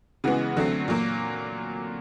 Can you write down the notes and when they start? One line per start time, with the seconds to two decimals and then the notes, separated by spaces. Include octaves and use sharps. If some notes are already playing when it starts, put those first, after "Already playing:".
0.24 C#3 E3 G#3 B3 F#4
0.56 D3 F#3 A3 C4
0.88 A#2 F#3 A#3